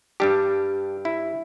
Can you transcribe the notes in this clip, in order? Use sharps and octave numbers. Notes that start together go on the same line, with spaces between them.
G2 G3 D4 G4
E4